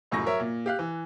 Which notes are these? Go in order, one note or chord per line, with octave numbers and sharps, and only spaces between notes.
C#2 F#2 A2 C#6 A#6
F#3 A#4 C#5 E5
A#2
G4 F5 F#6
E3